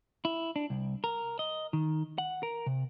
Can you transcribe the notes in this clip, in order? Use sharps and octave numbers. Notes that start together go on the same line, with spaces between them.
E4
D4
C2
A#4
D#5
D#3
F#5
A#4
C3